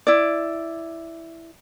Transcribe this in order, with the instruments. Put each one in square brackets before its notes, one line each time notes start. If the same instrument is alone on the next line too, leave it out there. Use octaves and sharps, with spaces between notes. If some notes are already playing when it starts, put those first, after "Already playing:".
[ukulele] E4 D5